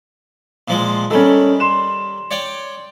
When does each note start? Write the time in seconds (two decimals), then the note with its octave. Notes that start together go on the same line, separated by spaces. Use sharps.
0.68 A#2 F3 G#3
1.10 D#3 G3 C#4 A4
1.60 C6 E7
2.31 C#5 D5 G5